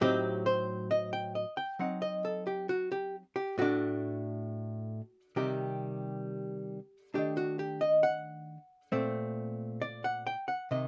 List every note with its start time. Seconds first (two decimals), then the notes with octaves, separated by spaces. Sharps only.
0.01 A2 F#3 C4 D#4 G4
0.46 C5
0.91 D#5
1.13 G5
1.35 D#5
1.57 G5
1.79 F#3 C4 D#4 F#5
2.02 D#5
2.25 A4
2.47 G4
2.69 F#4
2.92 G4
3.36 G4
3.58 A2 A3 D4 F#4
5.36 C3 D#3 G3 G4
7.14 D#3 A3 D4 G4
7.37 F#4
7.59 G4
7.81 D#5
8.03 F#5
8.92 A#2 A3 C4
9.82 D5
10.04 F#5
10.27 G5
10.48 F#5
10.71 C3 D#3 D#5